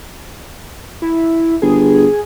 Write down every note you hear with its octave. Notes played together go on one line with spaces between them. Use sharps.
E4
G1 G#4